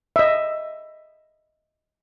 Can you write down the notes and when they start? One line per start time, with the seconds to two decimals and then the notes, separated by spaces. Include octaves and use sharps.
0.16 D#5 E5